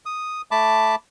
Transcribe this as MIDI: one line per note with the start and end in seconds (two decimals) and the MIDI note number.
0.06 0.42 87
0.51 0.95 57
0.51 0.95 81
0.51 0.95 83
0.51 0.95 86